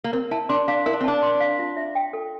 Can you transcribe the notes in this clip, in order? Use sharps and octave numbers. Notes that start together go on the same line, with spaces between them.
A#3
C4 A#4
E4 A5
D4 C6
D4 F5
E4 A#4
D4
C4
D4 A5
C6
F5
F4
E5
G5
A4